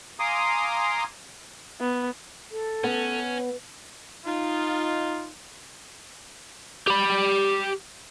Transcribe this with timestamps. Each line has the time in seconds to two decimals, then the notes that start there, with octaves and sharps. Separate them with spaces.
0.20 F5 G#5 A#5 C6 D6 D#6
1.81 B3
2.51 A4
2.84 B3 C#4
4.25 D#4 F4
6.88 G4 B5